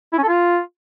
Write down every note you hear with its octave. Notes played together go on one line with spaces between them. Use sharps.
E4
C#4
A4
F4